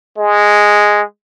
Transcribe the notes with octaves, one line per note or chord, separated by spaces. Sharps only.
G#3